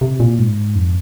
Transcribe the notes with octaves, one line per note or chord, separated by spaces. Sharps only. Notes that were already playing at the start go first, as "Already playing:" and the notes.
C3
A#2
G#2
F2